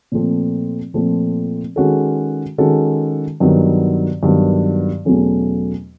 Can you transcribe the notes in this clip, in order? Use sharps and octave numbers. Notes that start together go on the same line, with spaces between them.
A#2 F3 A3 C4
A#2 F3 A3 C4
D#3 G#3 C#4 F#4 A4
D#3 G#3 C#4 F#4 A4
G2 D#3 F#3 B3
G2 D#3 F#3 B3
E2 B2 F#3 A3 C#4